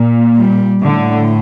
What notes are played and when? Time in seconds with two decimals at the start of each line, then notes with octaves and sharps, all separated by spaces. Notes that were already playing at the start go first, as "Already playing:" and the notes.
Already playing: A#2
0.37 G3
0.83 A2 D3